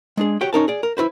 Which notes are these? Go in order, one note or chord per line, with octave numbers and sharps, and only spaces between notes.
G#3 D4 G#4
F#4 G4 C#5 G5
C#4 D#4 A#4 A5
G#4 D5
A#4
E4 F#4 B4 C5